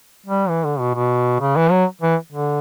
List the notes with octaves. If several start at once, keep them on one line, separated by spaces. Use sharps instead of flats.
G3
E3
D3
B2
B2
C#3
E3
F#3
E3
D3